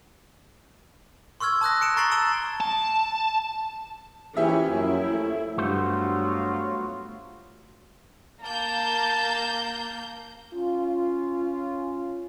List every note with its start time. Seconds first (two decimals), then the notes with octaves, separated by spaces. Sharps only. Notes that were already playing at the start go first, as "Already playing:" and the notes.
1.40 C6 C#6 E6 F6 G#6
1.61 A5 D#6 F#6 A#6
1.81 C#7 D7 E7
1.96 A#5 C#6 A6 C7 D7 F#7
2.11 A5 E6 A6 D7 E7 G7
2.61 A5
4.37 E3 F3 A#3 C#4 G4 G#4 E5
4.71 F#2 F3 E4
5.12 A3
5.58 G2 F#3 A3 B3 F4 F#4 C5
8.41 A#3 A5 A#5 G6
10.54 C#4 F4